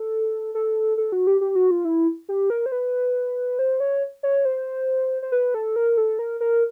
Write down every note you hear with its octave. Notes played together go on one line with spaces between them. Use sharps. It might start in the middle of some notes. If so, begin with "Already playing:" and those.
Already playing: A4
A4
A4
F#4
G4
G4
F#4
F4
E4
G4
A#4
C5
B4
C5
C#5
C#5
C5
C5
B4
A4
A#4
A4
A#4
A#4